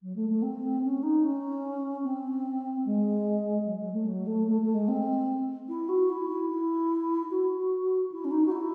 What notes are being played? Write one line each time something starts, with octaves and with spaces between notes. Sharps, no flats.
F#3
A3
A3
C4
C#4
D#4
C#4
C4
G#3
F#3
F#3
A3
F#3
A3
A3
A3
G#3
C4
E4
F#4
E4
E4
E4
F#4
E4
C#4
D#4
F#4
E4